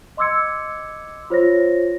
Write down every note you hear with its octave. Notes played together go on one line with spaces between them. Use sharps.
D#5 C6 D6 E6 G#6 C#7
F4 C5 C#5 A#6